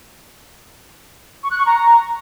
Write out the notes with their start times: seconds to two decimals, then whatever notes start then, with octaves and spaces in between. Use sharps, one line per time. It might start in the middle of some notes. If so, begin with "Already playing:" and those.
1.43 C#6
1.51 F#6
1.58 C#6
1.66 A#5